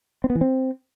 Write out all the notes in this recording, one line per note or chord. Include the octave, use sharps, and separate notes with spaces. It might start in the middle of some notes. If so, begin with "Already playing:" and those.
C4
B3
E3
C4